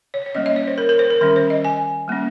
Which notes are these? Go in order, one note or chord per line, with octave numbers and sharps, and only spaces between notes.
C#5
C#5
G3 A#3 C#4 D#5
D#5
C#5
C5
A#4
A#4
C5
A#4
D#3 G3 C#4 A#4
C5
D#5
G#5
G3 A#3 C#4